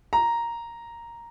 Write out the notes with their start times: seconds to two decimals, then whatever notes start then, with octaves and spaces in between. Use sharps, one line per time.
0.13 A#5